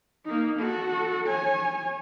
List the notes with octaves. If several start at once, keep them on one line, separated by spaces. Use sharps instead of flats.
A#3 D#4
F#4 A4
C#5 G#5